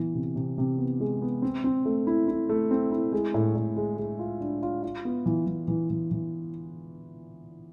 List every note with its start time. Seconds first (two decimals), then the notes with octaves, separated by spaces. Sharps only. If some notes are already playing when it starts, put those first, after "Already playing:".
Already playing: E3 B3
0.14 C3
0.36 C3
0.58 C3
0.78 B3
1.00 G#3
1.22 B3
1.42 C4
1.64 C4
1.85 A3
2.07 E4
2.28 E4
2.49 A3
2.71 C4
2.91 E4
3.12 G#3
3.34 A2
3.56 A2
3.76 G#3
3.98 G#3
4.19 F4
4.41 D4
4.63 F4
4.83 F4
5.05 B3
5.26 E3
5.47 E3
5.68 E3
5.90 E3
6.11 E3